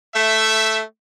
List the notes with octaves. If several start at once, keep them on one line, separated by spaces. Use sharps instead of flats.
A3 E5